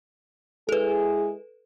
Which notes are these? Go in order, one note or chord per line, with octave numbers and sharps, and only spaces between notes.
G#3 E4 G#4 A4 B4